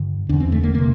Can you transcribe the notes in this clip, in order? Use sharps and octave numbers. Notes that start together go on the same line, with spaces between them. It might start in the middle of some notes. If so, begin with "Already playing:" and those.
Already playing: G2 D3
E2 D3 D4
C4
A3
A#3
C3 A#3